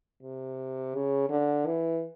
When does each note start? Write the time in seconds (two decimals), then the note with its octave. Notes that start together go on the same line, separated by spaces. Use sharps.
0.23 C3
0.95 C#3
1.30 D3
1.66 E3